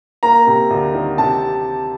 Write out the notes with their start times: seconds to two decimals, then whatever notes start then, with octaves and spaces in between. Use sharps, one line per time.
0.23 A#3 A#5
0.47 C3
0.70 D2
0.94 D#3
1.18 C3 A5